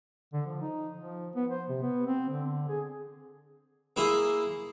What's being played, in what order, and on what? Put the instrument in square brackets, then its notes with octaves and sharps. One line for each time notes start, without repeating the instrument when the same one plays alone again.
[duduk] D3
F3
D#4
F3
B3
C5
C3
B3
C4
D3
G#4
[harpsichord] A#3 E4 G#4 E5 C6 D#6